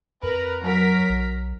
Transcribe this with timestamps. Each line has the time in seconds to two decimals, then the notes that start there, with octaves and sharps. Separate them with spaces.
0.23 F2 A#4 B4
0.64 F#3 A#4 B6
1.09 B1